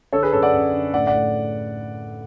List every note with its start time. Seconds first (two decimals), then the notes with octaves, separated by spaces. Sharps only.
0.12 D3 A4 C#5
0.23 G#4 B4
0.33 F#2 A4 C#5
0.43 D5 F#5
0.53 F#2
0.73 D3
0.93 A2 D5 F#5
1.07 D5 F#5
1.14 A2